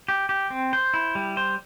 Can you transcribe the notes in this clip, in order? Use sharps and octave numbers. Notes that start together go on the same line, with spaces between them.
G4
G4
C4
C5
E4
G3
C5